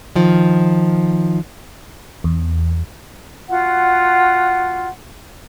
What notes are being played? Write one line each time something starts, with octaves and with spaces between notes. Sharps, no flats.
D#3 F3
E2
F4 F#4 F#5